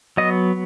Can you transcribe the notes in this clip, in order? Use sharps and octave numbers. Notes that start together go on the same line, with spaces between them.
F#3 B3 D#5